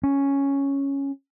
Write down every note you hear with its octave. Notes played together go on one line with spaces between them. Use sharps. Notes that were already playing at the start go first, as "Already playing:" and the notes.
C#4